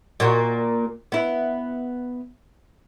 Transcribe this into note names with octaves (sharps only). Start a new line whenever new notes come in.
A#2 A#3 F#4
B3 E4